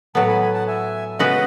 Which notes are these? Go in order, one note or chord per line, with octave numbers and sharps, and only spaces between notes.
A2 F#3 B3 F#5 A5
G#5 B5
G#5 B5
F#5 A5
E5 G#5
C#3 G#3 B3 F#4 B4 D#5 F#5